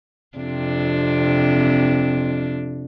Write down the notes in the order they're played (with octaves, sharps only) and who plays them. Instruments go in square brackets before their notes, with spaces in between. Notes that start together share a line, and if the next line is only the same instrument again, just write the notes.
[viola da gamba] F2 C3 D4